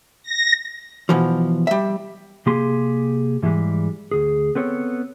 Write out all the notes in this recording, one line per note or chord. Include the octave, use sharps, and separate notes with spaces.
A#6
B2 E3 F3
G3 E5
C3 A#3 G4 G#4 C6
G#2 E3 F3 G3 G#3
D2 G#4
B3 C4 A4 C#5